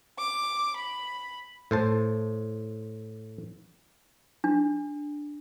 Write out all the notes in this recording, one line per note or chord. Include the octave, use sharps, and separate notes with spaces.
D6
B5
A2 C5 A5
D4